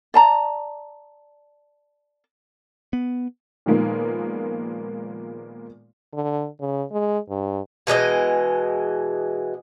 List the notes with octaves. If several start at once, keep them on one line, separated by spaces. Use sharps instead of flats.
D5 A5 A#5
B3
A#2 D#3 F3 G#3 A#3 B3
D3
C#3
G#3
G2
B2 E3 G#3 D#5